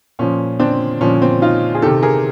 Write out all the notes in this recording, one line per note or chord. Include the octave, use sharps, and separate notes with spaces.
A#2 F3 C#4
C4 D4
A#2 F3 C#4
C4
D#4 F4
G#4
C3 D#3 G4 A4
G#4 A#4